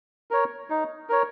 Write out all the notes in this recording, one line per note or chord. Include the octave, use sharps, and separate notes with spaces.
A#4 C#5
D#4
A#4 C#5